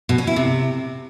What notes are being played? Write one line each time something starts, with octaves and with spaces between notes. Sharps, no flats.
B2
C#4
E4
C3